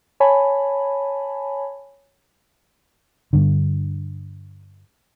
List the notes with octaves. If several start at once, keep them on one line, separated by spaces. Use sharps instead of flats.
C#5 G#5 A5 B5
G2 D3